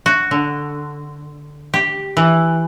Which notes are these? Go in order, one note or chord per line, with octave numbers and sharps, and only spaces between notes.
F#4
D3
G4
E3